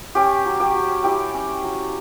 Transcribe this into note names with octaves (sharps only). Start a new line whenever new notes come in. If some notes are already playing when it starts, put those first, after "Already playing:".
C#4 G4 G5
F#3
G4 G5
F#3
E4 G4 G5
C#4
F#3